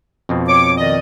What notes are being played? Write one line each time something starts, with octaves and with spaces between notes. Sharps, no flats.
F2 B2 C4
C#5 D6
D#3 D5 D#5